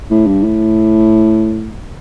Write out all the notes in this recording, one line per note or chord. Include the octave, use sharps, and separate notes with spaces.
A2
G2
A2